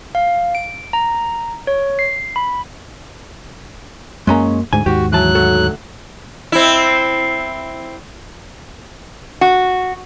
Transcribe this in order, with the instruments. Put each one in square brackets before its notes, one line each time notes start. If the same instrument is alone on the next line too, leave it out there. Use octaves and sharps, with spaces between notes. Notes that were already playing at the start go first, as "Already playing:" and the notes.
[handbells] F5
D7
A#5
C#5
C7
B5
[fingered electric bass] F#2 A#3 [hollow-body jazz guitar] G#3 C#4 A#5
[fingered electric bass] D2 G#2 [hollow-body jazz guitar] G#5
[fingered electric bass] D#2 G#2 [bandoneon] F#4 [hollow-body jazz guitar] G4
[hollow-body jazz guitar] E3 A5 [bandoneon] F#3 F#6
[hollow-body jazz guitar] D2 F#4 A4
[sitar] C4 E4
[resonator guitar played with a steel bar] F#4